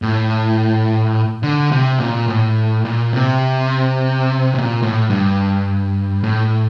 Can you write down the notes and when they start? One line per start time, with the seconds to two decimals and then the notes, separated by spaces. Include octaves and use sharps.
0.02 A2
1.43 D3
1.72 C3
1.99 A#2
2.28 A2
2.85 A#2
3.13 C3
4.54 A#2
4.83 A2
5.10 G2
6.23 A2